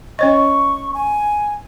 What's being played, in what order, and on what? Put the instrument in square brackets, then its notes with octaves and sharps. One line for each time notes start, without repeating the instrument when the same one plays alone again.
[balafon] C#4 C#5 D#5 [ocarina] C#6
[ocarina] G#5